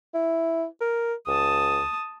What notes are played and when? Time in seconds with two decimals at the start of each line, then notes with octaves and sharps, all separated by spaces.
0.14 E4
0.80 A#4
1.27 C#2 A5 D#6